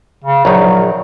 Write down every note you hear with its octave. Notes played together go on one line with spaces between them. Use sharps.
C#3
A#1 D#3 F#3